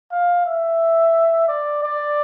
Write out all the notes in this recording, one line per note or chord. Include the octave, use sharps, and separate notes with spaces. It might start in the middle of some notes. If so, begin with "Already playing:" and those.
F5
E5
D5
D5